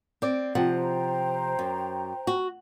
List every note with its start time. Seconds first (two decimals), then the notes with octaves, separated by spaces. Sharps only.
0.22 C4 D5
0.55 C3 F3 C5 F#5 G5 A#5
1.59 F#2
2.27 F#4